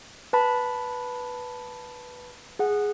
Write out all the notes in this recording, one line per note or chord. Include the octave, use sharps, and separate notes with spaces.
B4 A5 B5
G#4 F#5